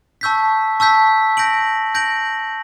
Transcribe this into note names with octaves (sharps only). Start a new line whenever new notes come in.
A5 C#6 E6 G6 B6
A5 C#6 E6 G6 B6
G6 A#6 D7 F#7
G6 A#6 D7 F#7